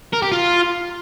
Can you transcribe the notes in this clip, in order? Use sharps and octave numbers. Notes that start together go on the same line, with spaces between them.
A#4
G4
F4